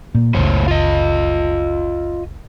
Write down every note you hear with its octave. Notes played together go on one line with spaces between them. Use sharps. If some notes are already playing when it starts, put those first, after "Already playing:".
A#2
F#1 C#2 A2 C5 C#5
F4 D#5